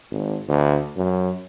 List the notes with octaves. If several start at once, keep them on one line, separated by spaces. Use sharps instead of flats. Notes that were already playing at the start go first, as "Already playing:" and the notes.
G#1
D2
F#2